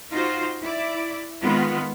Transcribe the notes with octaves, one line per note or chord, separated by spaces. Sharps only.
D#4 F4 F#4 C5
E4 D5
D#3 G#3 B3 F4